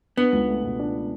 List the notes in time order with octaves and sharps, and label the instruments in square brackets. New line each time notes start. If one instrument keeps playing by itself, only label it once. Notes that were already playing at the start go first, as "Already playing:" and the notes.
[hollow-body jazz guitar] B3 [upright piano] D4
[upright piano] C#2
A3
B2
D4